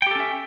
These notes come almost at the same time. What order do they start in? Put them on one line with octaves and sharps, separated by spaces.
G5 G4 A4 C#4 E5